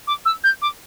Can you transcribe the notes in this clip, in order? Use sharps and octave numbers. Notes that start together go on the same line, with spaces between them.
D6
E6
G6
D6